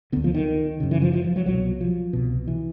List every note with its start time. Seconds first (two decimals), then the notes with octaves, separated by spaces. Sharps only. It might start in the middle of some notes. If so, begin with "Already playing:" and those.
0.12 D3 B3
0.16 D2
0.24 F3
0.35 D#3
0.80 F#2 C#3
0.91 E3
1.02 F3
1.13 F3
1.24 F3
1.36 F#3
1.46 C2 B2 F#3
1.81 F3
2.13 C2 B2
2.48 E3